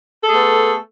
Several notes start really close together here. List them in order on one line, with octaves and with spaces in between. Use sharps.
A4 G#4 A3 B3